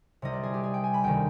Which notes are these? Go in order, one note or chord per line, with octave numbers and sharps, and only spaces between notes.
C2 C3 G3 D#5
D5
G#4
G4
G#4
G5
G#5
B5
D2 C3 D#3 G5